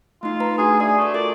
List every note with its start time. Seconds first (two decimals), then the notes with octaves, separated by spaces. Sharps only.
0.23 A3 D#4 F4
0.40 B4 A#5
0.58 A3 D4 F#4 G#4
0.80 G#4 D5 E5
0.98 A3 F#4 D5
1.14 F4 A4 A#4 D5